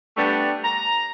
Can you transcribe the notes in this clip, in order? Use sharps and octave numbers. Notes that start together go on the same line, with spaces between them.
G3 A3 B3 D4 G4
A#5